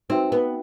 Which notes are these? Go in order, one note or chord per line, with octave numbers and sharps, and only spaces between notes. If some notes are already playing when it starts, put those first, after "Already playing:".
C4 D#4 F#4 B4 E5 G5
B3